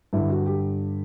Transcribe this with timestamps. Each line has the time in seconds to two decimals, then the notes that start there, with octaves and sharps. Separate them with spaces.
0.13 G2 D3 E4
0.29 F#4
0.46 G4